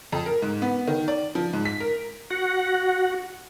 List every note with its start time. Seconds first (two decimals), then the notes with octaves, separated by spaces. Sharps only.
0.12 F2
0.26 A#4
0.42 G#2
0.62 B3
0.87 D#3
1.08 D5
1.35 F3
1.53 G#2
1.65 B6
1.80 A#4
2.30 F#4 F#5